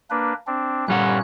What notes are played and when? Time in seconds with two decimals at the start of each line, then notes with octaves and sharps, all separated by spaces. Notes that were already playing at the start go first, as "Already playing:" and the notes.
0.10 A#3 D4 B4
0.47 C4 D4
0.88 G2 A#2 G3 C#4 F#5 F#6